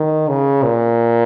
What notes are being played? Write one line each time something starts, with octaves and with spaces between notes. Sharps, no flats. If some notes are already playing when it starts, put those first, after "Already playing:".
Already playing: D#3
C#3
A#2